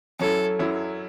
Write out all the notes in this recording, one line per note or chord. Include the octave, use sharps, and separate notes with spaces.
F#2 F#3 C#4 E4 A4
F#2 F#3 C#4 E4